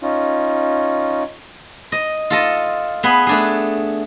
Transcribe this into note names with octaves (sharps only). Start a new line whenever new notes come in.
C#4 D#4 F4
D#5
F4 A4 D#5
B3 G#4 B4
A3 D4 G#4